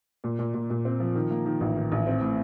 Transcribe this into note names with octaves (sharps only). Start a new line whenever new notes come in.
A#2
A#2
A#2
A#2
C4
F3
D#3
A#3
D#3
A1
D#3
A1
C4
A2